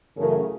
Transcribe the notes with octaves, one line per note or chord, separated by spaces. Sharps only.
F#2 C#3 E3 A3 C#4 G#4 A#4